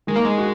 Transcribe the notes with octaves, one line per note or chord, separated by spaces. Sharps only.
D#3 G#3
A#3
G#3
F#4